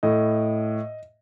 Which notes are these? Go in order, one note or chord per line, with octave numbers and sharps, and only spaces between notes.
A2 D#5